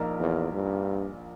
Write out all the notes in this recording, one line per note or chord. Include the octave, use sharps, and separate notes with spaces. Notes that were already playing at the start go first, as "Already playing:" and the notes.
Already playing: A#1 A#2 A#3 D#4 A#4
E2
G2